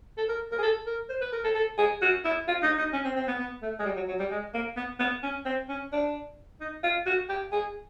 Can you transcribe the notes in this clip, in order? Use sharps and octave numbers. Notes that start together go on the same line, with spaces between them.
A4
A#4
A#4
G#4
A4
A#4
C5
B4
A#4
A4
A4
G#4
F#4
E4
F4
D#4
D#4
C#4
C4
C4
B3
B3
A3
G#3
G3
F#3
F#3
G3
G#3
A#3
B3
B3
C#4
C4
C#4
D4
D#4
F4
F#4
G4
G#4